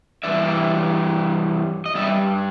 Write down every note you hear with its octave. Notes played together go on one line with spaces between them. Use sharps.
G2 E3 G3 D5 E5
D#5
G2 E3 G3 D5 E5